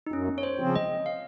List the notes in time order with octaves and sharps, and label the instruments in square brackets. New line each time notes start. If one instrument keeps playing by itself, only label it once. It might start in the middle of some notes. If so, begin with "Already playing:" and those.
[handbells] D#4
[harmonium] F#2 [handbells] C#4
[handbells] C#5
C5
[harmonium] C#3 F3 C4
[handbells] D#5
F5